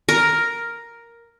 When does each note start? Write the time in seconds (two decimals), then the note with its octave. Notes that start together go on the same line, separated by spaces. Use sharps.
0.09 A#4